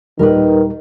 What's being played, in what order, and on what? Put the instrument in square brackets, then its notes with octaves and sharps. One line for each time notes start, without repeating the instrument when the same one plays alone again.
[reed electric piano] D#2 A#2 G3 [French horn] D#3 [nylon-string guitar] A#4 B4